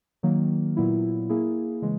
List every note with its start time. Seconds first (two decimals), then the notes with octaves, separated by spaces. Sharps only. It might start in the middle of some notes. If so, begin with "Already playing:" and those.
0.23 D#3 F#3 A#3
0.76 A#2 F#3 B3 E4
1.30 A#3 E4 G#4
1.82 C#3 E3 G#3